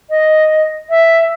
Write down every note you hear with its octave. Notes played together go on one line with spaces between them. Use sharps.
D#5
E5